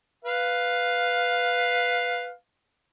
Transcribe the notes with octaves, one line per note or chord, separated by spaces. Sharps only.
B4 F5